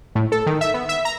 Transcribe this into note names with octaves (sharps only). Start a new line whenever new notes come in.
A2
A4
D#3
E5
B3
E5
A#5